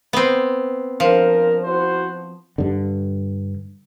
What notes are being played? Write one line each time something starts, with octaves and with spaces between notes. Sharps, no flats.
B3 C4
F3 D4 A#4
E4 F#4 C5
G2 D3